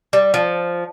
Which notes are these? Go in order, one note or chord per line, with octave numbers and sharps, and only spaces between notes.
G3
F3